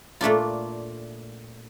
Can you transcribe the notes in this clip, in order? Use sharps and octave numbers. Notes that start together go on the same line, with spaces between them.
A#2 A3 D4 F4